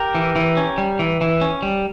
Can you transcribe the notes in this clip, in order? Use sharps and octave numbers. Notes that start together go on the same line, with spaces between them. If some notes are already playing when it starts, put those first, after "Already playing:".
Already playing: G4 A#4
E3
E3
C#4
G3
E3
E3
C#4
G3